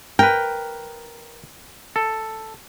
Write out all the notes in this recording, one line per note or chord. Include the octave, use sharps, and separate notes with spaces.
A#4 B4 G5
A4